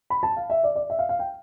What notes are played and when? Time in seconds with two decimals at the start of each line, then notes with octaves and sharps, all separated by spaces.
0.10 B5
0.23 A5
0.37 F5
0.50 E5
0.63 D5
0.75 D5
0.90 E5
0.99 F5
1.09 F5
1.19 G5